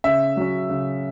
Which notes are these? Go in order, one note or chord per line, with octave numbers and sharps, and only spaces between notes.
C#3 E5
F#3 C#4
C#3